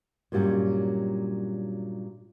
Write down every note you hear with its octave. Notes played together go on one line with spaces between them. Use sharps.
G2 A#2 F#3 G3 C#4